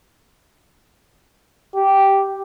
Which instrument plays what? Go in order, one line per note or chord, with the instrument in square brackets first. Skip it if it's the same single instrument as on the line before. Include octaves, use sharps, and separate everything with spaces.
[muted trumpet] G4